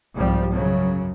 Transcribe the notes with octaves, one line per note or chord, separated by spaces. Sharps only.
C2 G#2 F3 G3
F#2 C#3 F#3